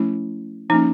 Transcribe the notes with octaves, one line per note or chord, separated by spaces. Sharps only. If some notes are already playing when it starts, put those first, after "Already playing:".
Already playing: F3 A3 C#4 E4
F3 A#3 C#4 D#4